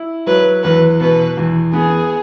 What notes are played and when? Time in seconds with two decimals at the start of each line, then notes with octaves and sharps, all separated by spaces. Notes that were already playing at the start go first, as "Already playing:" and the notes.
Already playing: E4
0.27 F#3 B4
0.63 E2 B4
1.01 B2 B4
1.37 E2
1.73 B3 G#4